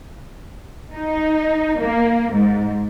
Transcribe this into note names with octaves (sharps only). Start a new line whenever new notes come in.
D#4
A#3
G#2